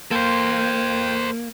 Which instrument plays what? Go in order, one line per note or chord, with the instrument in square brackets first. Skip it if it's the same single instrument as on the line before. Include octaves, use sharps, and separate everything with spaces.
[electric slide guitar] A#3 [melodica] F4 G5 [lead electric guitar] A4 C5